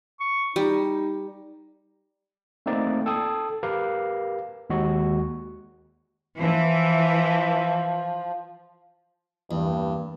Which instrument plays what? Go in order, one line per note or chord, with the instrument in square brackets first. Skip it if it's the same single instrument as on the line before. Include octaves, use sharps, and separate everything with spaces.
[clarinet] C#6
[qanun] G3 [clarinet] D#4
[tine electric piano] A3 A#3 C4 D#4 D5
A4 G5 A5 D#6
G4 A#4 B4 F5
D#2 G#3 F#4
[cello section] E3 [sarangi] F3
[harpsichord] E2 [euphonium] G2 [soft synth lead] A#3